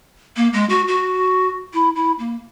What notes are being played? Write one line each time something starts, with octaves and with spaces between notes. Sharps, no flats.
A#3
G#3
F#4
F#4
E4
E4
A#3